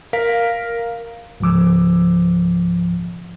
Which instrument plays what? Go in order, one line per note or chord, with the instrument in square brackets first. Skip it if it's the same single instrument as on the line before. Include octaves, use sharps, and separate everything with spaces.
[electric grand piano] A#4 F5 B6
[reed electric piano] C#2 G#2 F3 D6 E6